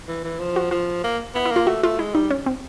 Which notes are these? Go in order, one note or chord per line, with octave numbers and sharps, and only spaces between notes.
E3
E3
F3
F#4
F3 F4
A#3
B3 E4
E4
A#3 F4
A3 F#4
A3 F4
G#3 E4
G3 D#4
C#4
C4